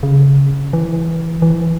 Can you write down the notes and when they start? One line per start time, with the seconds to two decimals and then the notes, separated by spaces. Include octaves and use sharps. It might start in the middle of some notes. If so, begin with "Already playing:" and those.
0.03 C#3
0.73 E3
1.42 E3